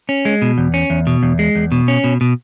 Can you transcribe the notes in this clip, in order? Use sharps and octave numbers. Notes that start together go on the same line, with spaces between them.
C#4
G#3
B2
E2
C#4
E2
B2
E2
G#3
E2
B2
C#4
B2
B2